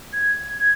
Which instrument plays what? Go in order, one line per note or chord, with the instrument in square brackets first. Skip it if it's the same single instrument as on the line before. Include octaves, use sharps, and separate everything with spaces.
[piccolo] G#6